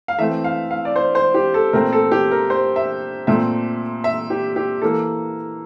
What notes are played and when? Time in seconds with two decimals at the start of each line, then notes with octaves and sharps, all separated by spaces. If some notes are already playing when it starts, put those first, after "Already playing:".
0.08 F5
0.19 E3 A3 C4 E5
0.44 F5
0.71 F5
0.85 D5
0.96 C5
1.15 C5
1.34 G4
1.54 A4
1.73 A#2 A3 C4 A#4
1.93 A4
2.12 G4
2.31 A#4
2.50 C5
2.76 E5
3.27 A#2 A3 C4 E5
4.04 E5
4.30 G4
4.56 G4
4.82 E3 A#3 A4